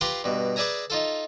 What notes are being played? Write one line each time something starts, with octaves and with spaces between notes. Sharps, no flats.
F4 G4 B4 G5 A#5 C6
G2 B2
G#4 B4 D5 E5 G#5 A#5
D#4 F4 A4